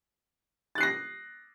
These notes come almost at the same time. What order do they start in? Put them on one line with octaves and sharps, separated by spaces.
A6 F#6 C7 A#6